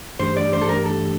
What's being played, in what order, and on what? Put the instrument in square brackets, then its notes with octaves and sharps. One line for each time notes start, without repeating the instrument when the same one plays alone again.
[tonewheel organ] G2 E3 A3 D4 G4 [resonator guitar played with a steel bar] C5
[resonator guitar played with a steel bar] D5
C5
A4
A#4
A4